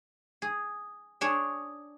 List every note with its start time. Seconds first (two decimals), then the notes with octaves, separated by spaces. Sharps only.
0.42 G#4
1.21 D4 G#4 C#5